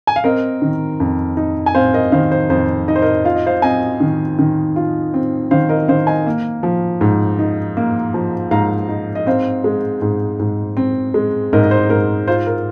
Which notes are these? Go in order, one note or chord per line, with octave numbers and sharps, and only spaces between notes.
G#5
F5
C4 A#4 D#5
D#3
F2
D#4
G#5
C4 C5 F5
A#4 D#5
D#3 C5 F5
C5
F2 C5
D#4 D#5
C5
A#4 D#5
F4 F5
D#5
C5 F5
C4 D#5 G#5
D#3
D#3
F4
C4
D#3 C5 F5
A#4 D#5
D#3 C5 F5
D#5 G#5
A#3
F3
G#2
D#4
A#3
F3
G#2 F5 A#5
D#4
D#5
C4 C5 F5
G#3
G#2
G#2
C4
G#3
G#2 A#4 D#5
D#5
C5
G#2 A#4
F4 C5
A#4